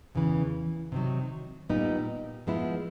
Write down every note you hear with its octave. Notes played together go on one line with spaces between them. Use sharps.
E2 C#3 E3
C3 D#3 F#3
A#2 G3 B3 D#4
F3 G#3 B3 E4